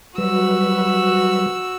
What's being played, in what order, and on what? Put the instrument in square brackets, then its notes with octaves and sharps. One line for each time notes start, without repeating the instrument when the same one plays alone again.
[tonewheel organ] F#3 G3 B4 [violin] F#4 E6